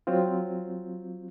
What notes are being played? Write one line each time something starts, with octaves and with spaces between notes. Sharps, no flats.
F#3 C4 F4